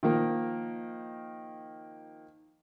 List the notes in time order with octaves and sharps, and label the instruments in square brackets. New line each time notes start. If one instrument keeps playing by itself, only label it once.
[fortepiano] D#3 F3 A#3